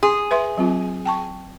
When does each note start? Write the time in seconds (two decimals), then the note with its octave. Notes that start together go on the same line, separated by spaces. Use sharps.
0.03 G#4 C6
0.31 B4 E5 C6
0.57 F#3 C4 F4
1.05 G5 A5 C#6